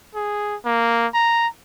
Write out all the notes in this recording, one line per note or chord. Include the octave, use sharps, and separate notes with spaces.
G#4
A#3
A#5